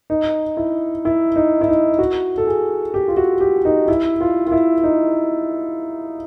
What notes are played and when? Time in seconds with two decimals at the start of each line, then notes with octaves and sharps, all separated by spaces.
0.10 D#4
0.57 E4
1.05 E4
1.36 D#4
1.61 E4
1.68 D#4
1.99 F#4
2.38 A4
2.47 G#4
2.94 G4
3.08 F4
3.17 F#4
3.41 G4
3.65 D#4
3.88 E4
4.21 F4
4.47 F4
4.52 E4
4.83 D#4